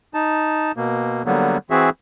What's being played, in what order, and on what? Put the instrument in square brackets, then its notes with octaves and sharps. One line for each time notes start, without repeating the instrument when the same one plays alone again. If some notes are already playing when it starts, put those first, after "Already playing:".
[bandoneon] D#4 A5
B2 A#3
D3 F#3 G3 A#3 B3
E3 C4 F#4 G#4 E5